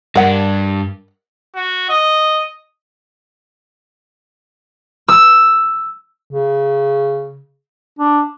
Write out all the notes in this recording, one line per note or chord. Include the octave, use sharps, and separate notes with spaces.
G2 D4 A#4 F#5
F#4
D#5
E6
C#3
D4